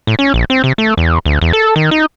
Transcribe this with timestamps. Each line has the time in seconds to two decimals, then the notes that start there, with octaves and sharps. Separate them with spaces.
0.07 A2
0.19 C#4
0.34 A#1
0.50 C4
0.64 C3
0.78 A3
0.97 E2
1.26 D2
1.41 E2
1.53 A4
1.76 D#3
1.91 D#4